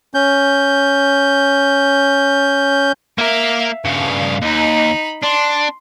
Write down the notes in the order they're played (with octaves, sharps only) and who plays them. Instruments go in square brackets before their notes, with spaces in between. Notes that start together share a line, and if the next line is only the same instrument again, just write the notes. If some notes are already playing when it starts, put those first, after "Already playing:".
[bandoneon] C#4 G6
[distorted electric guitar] A#3 A#4 [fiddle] E5 F5
[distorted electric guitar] G2 C#3 [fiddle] F5
[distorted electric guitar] D#2 [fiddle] D#4 B5
[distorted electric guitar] D4 [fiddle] C6